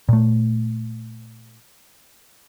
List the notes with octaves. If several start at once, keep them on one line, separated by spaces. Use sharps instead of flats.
A#2 A3